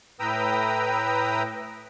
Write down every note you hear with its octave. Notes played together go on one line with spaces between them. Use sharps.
A2 B4 G5 A#5 D#6 E6